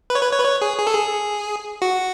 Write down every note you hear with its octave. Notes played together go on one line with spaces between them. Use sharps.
B4
C#5
B4
C#5
B4
C#5
G#4
G#4
A4
G#4
F#4